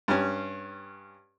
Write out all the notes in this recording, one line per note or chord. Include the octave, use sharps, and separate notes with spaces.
G2 C#4